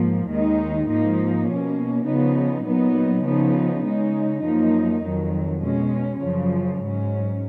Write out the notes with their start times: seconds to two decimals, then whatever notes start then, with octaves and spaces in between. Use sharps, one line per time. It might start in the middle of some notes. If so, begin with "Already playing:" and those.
Already playing: G#2 F3 A#3
0.28 D#2 D#3 G#3 D#4
0.88 G#2 F3 A#3 D#4
1.47 B2 A#3 C#4
2.06 C#3 F3 B3 D#4
2.65 A#2 F#3 B3 D#4
3.24 C#3 F3 B3 D#4
3.84 C#3 G#3 D#4
4.43 F#2 F3 A#3 D#4
5.03 F2 D#3 F#3
5.62 B2 G#3 C#4
6.21 F#2 C#3 F3
6.81 G#2 F#3 C#4